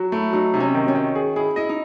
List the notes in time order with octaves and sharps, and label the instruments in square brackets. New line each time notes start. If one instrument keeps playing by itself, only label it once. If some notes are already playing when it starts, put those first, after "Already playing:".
Already playing: [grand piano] F#3 [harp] F#4
[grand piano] A3 [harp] E4
[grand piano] F#3 [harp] D#4
[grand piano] C3 [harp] D#4
[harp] C#4
[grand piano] D#3
[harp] C#4
[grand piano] D#3
G#4
[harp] E4 [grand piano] G#4
[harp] E4 [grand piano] D#5
[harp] D#4